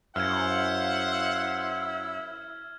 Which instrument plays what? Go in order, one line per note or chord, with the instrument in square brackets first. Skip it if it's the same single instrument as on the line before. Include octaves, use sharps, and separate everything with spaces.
[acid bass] F#2 [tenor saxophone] E4 [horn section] C5 F5 F#5 [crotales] F6 G#6